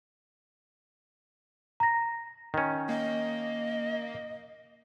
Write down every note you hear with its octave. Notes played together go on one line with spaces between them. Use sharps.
A#5 A#6
D#3 C#4
A#3 D#5